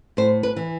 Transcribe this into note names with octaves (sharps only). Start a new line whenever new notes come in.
A2 C5
B4
E3